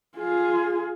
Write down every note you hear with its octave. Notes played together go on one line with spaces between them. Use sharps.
F4 G#4